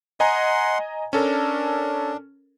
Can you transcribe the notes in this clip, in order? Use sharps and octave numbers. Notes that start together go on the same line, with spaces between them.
D#5 F#5 G#5 A#5 C6
C#4 D4 A4 A#4